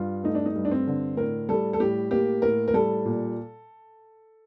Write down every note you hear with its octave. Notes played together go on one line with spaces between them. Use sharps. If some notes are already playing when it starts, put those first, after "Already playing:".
Already playing: G2 F4
A3 D#4
D4
D#4
G2
D4
C4
D3
A2 A#4
G3 A4
A4
A2 G4
A#3 G4
A2 A#4
A#4
G3 A4
A#2